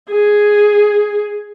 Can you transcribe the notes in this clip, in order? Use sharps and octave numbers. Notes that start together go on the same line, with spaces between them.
G#4